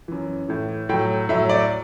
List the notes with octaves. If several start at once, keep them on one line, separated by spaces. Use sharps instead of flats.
F#2 E3
A2 E3
A2 F#3 G5
A2 F#3 E5
D5